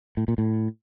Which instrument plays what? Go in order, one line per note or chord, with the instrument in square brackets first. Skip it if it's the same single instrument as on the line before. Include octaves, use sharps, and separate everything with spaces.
[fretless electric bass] A2
A#2
A2